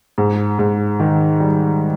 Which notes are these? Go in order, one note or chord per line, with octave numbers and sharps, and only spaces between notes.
G#2
G#2
D#3
G3